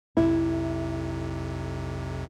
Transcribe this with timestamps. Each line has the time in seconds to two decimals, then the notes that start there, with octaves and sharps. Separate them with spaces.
0.17 B1 F2 C3 E4